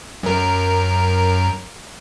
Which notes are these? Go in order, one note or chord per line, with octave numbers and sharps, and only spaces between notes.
F#2 A#4